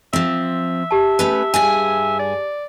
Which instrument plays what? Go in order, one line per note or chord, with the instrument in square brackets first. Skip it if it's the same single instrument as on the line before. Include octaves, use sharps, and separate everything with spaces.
[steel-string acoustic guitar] F3 C4 [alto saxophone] E5
[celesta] G4 A5
[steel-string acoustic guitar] A3 C#4 B4
G2 G#4 G#5
[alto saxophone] D5